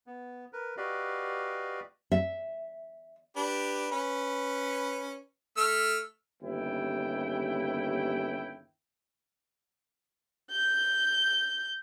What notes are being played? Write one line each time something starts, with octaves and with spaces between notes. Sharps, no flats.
B3
A#4 B4
F#4 G4 B4 D5 D#5 F5
E5
D4 G4 B4
C#4 B4
A3 E6 F6
G1 D#2 C#3 E4 G5
G6